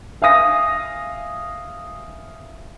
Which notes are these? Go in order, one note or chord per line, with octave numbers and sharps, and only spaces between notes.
E5 F5 G#5 D#6 A#6